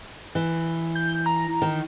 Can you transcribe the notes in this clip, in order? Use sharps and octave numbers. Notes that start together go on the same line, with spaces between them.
E3
G6
A#5
D#3